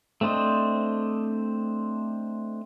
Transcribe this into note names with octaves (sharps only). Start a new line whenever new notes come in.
A3 C4 D4 C5 D#5